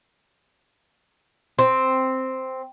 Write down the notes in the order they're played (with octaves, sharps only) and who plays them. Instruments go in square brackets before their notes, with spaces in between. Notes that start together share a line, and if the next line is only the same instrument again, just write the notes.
[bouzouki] C4